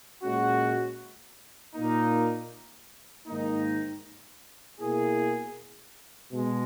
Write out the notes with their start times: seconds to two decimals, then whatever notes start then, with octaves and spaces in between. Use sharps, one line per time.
0.23 A#2 G#3 C#4 F#4
1.75 A#2 A#3 D#4
3.27 G#2 D#3 A#3 D#4
4.80 B2 A#3 E4 G#4
6.32 B2 G#3